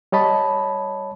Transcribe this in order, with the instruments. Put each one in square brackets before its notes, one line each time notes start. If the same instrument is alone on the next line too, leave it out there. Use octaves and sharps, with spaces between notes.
[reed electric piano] G3 C#5 D#5 A5 B5